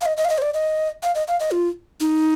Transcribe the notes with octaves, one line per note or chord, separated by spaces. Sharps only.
F5
D#5
D#5
F5
D#5
C5
D5
D#5
F5
D#5
F5
D#5
F4
D#4